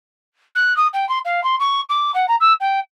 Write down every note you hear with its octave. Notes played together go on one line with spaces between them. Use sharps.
F#6
D#6
G5
C6
F5
C6
C#6
D6
F#5
A#5
E6
G5